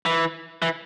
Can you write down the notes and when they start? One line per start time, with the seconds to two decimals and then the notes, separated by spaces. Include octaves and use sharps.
0.06 E3
0.62 E3